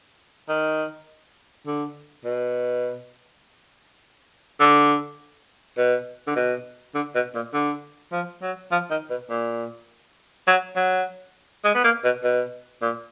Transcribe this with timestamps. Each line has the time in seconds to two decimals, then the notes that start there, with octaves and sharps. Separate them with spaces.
0.49 D#3
1.67 D3
2.25 B2
4.60 D3
5.78 B2
6.27 D3
6.36 B2
6.95 D3
7.15 B2
7.35 A#2
7.53 D3
8.12 F3
8.42 F#3
8.72 F3
8.91 D#3
9.10 B2
9.30 A#2
10.47 F#3
10.76 F#3
11.64 G#3
11.75 B3
11.84 A#3
12.04 B2
12.24 B2
12.81 A#2